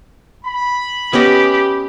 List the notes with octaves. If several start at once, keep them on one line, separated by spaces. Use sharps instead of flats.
B5
B3 C#4 G4 D#5